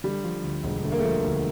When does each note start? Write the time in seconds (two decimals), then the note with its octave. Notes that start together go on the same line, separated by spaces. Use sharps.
0.04 D3 G3
0.24 F3
0.43 D2
0.64 E1
0.84 D3 A3
0.92 A#3
1.00 F3 A3
1.24 D2